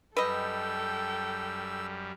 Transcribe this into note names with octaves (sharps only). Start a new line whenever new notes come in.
F#2 G3 A4 B4 D#5 G5 E6